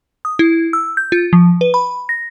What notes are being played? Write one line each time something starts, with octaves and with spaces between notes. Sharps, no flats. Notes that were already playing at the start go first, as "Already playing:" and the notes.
D#6
E4
E6
G6
F4
F3
B4
B5
A#6